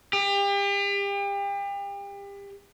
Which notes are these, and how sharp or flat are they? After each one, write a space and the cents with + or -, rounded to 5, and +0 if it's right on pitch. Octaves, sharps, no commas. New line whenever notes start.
G4 +35